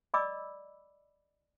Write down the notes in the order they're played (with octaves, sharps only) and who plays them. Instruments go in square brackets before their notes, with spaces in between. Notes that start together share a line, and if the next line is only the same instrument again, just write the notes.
[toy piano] D5 D#5 B5 D6 E6